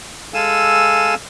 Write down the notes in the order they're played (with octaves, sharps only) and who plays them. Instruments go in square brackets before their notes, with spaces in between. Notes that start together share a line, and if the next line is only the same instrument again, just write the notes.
[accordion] G#3 A4 F5 G#5 E6